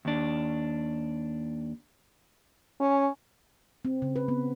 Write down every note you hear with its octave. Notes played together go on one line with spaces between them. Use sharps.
D#2 D4
C#4
C4
C#3
B4
B3